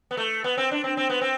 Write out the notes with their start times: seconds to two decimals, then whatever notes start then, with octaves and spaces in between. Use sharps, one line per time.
0.11 B3
0.17 A3
0.44 B3
0.57 C4
0.71 D4
0.84 C4
0.97 C4
1.10 B3
1.21 C4